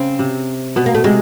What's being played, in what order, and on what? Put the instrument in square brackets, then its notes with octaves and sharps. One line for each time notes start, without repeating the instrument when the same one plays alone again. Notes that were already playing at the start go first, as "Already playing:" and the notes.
Already playing: [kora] C#3 [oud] C4
[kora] C3
[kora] B2 [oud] B3
[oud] A#3
A3
[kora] C3 [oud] G#3